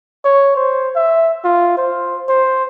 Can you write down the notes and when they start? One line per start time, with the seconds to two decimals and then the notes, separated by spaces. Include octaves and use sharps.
0.24 C#5
0.56 C5
0.96 E5
1.44 F4
1.77 C5
2.29 C5